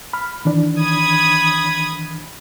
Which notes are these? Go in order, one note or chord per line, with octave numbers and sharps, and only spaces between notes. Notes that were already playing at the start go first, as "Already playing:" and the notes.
B5 F6
D#3 E3 D4
B5 D#6 G#6